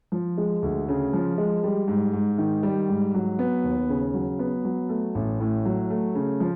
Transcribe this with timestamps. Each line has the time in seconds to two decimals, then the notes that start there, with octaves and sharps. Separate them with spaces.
0.12 F3
0.38 G#3
0.62 D2
0.88 C#3
1.13 F3
1.38 G#3
1.64 G3
1.88 G#2
2.13 G#2
2.38 D#3
2.63 G3
2.88 G#2
3.14 F#3
3.39 B3
3.64 D#2
3.89 C#3
4.14 F#3
4.39 B3
4.65 F#3
4.89 A3
5.15 A1
5.40 A2
5.65 F#3
5.90 A3
6.15 C#3
6.40 F3